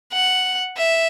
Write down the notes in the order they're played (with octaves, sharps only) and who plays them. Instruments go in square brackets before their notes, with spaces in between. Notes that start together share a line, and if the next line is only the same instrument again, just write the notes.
[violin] F#5
E5